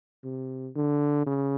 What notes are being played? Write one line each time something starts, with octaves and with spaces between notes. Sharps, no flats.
C3
D3
C#3